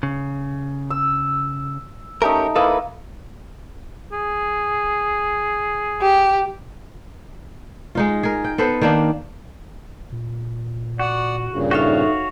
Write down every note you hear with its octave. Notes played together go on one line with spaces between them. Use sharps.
C#3
E6
A3 C#4 D#4 G4 A#4
A#3 E4 A4 B4 D#5
G#4
G4
G#3 D#4 F4
G#4 A#4
G5
B3 A4 B4 C5
D#3 A#3 D4 D#4
A#2
F#4 D5 F#5
G2 A#2 C#3
D#4 F#4 A4 C#5 E5 F5